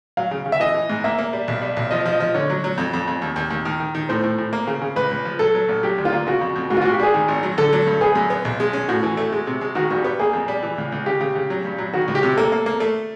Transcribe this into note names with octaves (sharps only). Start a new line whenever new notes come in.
F#3 F5
C#3
C#3
E5
E3 D#5
E3
G#2
A#3 E5
A#3
G3
B1
G3
B1
F3 D#5
F3
D#5
F3
D3 C#5
F#3
F#3
F2
F2
F2
D#2
D#2
D#2
D#3
D#3
D#3
A2 C5
A2
A2
A#3
C#3
C#3
C#2 B4
C#2
F3
F#3 A4
F#3
A#1
F#3 G4
D2
F4
A#3
C#3 F#4
F2
F2
G#2 F#4
F4
G#2 F#4
G4
G3 G#4
D#3
G#1
F#3
D3 A4
F#3
G2
B3 G#4
F#2
B3
B1
G#3
C#4
A2 F#4
E3
A3
G#3
C3
G#3
D#3 F#4
G2 F#4
G4
B3
A#3 G#4
F2
G3
E3
C#2
C#2
C#3 G4
C#3
C#3
F#3
G2
F#3
D#3 F#4
C#2
G4
C3
A#3 A4
A#3
A#3
A3